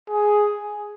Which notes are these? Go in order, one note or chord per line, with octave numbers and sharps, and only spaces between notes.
G#4